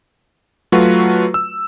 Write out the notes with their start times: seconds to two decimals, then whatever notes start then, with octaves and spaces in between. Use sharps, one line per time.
0.72 F#3 A3 F4 F#4 B4
1.34 E6